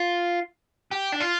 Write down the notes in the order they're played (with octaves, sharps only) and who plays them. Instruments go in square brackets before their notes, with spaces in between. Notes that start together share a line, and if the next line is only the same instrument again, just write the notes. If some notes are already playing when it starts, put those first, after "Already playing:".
Already playing: [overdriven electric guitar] F4
G4
D4
F4